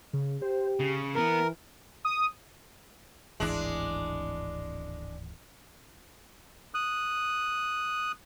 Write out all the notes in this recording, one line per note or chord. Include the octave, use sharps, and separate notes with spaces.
C#3
G4 C5
C#3 C#7
E3 B3 A#4
D#6
D1 G#1 E3 G#3 D4
D#6 F#6